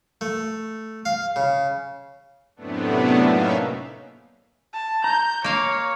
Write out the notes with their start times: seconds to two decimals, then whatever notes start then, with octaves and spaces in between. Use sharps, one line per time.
0.21 A3
1.05 F5
1.36 C#3
2.56 F#2 A2 C3 A3 B3 D4
3.20 A#3 C#4 D#4 E5 F5
4.73 A5
5.04 A#5 G6
5.44 A#3 C#5 F5